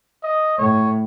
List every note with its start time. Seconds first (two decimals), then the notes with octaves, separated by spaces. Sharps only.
0.23 D#5
0.58 A2 C#5